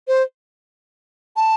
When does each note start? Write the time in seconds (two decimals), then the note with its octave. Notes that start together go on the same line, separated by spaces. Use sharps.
0.08 C5
1.36 A5